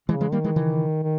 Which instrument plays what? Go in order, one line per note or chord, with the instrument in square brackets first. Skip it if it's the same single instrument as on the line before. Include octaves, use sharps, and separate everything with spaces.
[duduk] C#3 [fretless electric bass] E3 G#3
[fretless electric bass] E3 G#3
[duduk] D#3 [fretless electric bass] G3 A#3
[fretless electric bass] E3 G#3
C#3 E3
[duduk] D#3